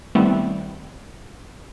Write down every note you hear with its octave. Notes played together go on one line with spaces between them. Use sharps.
D#3 G3 A3 B3 C4 E4